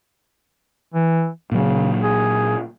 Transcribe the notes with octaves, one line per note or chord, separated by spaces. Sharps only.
E3
A#2 C#3 F#3
G#4